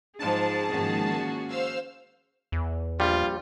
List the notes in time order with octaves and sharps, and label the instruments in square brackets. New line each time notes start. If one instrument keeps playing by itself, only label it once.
[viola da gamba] G#2 F3 [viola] G#4 [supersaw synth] A5
[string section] G#2 D#3 F3 [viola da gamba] A#3 C#4 F#4
[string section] C5 F5 E6
[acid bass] E2
[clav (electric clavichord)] A#1 G3 [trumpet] F4